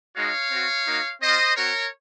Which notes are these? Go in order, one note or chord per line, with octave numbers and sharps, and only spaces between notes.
G#3 D#4 F#4 C#5 F5
C4 F#4
A#3 D#4 F#4
C4 F4 C5 D#5
C4 F#4 A#4 C#5